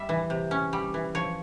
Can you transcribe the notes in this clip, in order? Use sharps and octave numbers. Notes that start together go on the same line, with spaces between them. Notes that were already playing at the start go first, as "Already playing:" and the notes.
Already playing: G3 E5
E3
C3
C#4
G3
E3
F3 C#5